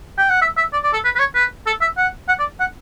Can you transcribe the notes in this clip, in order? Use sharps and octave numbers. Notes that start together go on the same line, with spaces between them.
G5
F#5
E5
E5
D5
D5
A4
B4
B4
C#5
B4
A4
E5
F#5
F#5
D5
F#5